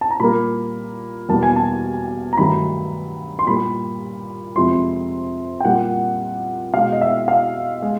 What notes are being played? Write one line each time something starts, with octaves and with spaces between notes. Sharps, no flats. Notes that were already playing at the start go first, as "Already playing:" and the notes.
A5
A#5
A#2 G3 A#3 B5
E2 B2 G3 A#3 A5
G#5
A5
A#5
G2 D#3 F#3 A3 B5
C6
A#2 G3 A#3 B5
F2 C3 F3 G#3 C6
G5
A#2 G3 A#3 F#5
B2 G#3 F5
D#5
E5
F5
G#3